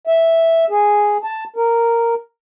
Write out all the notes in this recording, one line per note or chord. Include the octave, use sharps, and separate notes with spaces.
E5
G#4
A5
A#4